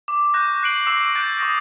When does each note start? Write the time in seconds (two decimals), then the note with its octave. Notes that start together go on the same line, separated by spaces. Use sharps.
0.08 D6
0.34 C#6 D6 F#6 G6 A#6
0.63 F#6 C7 D7 F#7
0.85 C#6 D6 E6 A#6 C7 F#7
1.15 F#6 G6 A6 D7
1.39 C#6 D#6 A#6